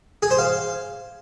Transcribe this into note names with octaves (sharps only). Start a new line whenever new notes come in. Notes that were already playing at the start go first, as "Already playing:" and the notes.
G#4
C5
F5